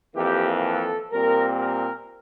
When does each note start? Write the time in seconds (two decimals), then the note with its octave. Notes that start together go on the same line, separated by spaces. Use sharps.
0.16 F2 E3 A#3 G4
0.64 A4
1.12 A#2 G3 C4 A#4
1.60 A#4